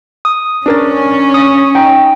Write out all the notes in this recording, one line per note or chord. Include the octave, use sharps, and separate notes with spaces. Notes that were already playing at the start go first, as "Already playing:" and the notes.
D#6
C#4 D4 A#4 A6
D#6
D#4 G5